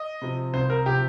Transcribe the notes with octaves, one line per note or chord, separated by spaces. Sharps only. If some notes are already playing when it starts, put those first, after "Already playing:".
Already playing: D#5
C3 F3
C2 C5
A#4
C3 F3 G4